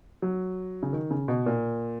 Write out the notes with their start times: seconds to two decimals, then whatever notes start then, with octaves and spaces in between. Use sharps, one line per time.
0.22 F#3
0.83 C#3
0.93 D#3
1.11 C#3
1.28 B2
1.46 A#2